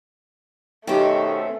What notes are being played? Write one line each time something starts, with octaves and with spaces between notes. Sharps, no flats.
B2 D#3 A3 C4 C#4 G4 G5